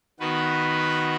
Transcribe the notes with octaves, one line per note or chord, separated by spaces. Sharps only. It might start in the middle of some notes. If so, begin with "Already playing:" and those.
D#3 B3 F#4 B4